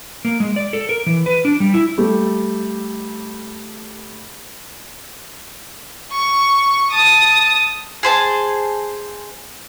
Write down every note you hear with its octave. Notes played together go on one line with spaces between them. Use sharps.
A#3
G#3
D5
A4
A#4
E3
B4
D4
G3
E4
G3 A3 G4 A4
C#6
A5 D#6
G#4 C5 A5